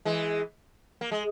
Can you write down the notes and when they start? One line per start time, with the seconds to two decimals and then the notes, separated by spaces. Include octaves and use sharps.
0.05 E3 G#3
1.01 A#3
1.12 G#3